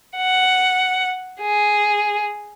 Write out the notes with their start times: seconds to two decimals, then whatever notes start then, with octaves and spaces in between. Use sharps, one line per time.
0.17 F#5
1.41 G#4